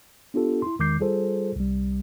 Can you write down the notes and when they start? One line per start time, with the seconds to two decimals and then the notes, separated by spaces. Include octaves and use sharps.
0.34 B3 D4 F4 G4 A4
0.62 E4 C6
0.79 E2 D#3 G#3 D6 G6 C7
1.00 G3 F4 G#4 A4 C5
1.56 C2 G3